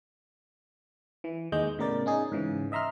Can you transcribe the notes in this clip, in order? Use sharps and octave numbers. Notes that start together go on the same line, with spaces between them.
E3
D#2 G#3 D#5 G6
A2 C#3 B3 A#4 D5 A6
C#4 D#4 G#4
G#2 C#3 E3
D#5 E5 A#5 C6 F6